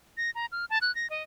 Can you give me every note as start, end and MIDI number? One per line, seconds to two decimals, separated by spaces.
0.17 0.30 94
0.35 0.46 82
0.52 0.65 89
0.70 0.78 81
0.82 0.93 90
0.95 1.09 94
1.10 1.23 75